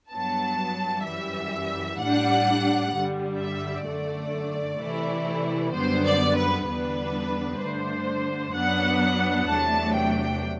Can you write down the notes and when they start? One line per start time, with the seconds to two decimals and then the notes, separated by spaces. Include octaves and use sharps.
0.10 G2 F#3 B3 A5
1.04 F#2 E3 G3 E5
1.98 A2 G3 D4 F#5
2.91 G2 D3 G3
3.38 E5
3.85 F#2 D3 A3 D5
4.80 C3 E3 A3 E4
5.73 F#2 D3 G3 B3 C5
6.05 D5
6.36 B4
6.67 E2 D3 G3 B3 D4 B4
7.61 G2 D3 A3 D4 C5
8.55 F#2 F#3 B3 D4 F#5
9.48 E2 C3 F#3 A3 D4 A5
9.95 G5